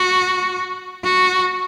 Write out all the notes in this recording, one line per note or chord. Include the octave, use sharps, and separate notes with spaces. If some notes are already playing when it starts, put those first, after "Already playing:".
Already playing: F#4
F#4